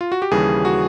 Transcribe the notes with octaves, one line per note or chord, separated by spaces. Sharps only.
F4
F#4
G4
D#2 C#3 E3 G3 G#4
F#4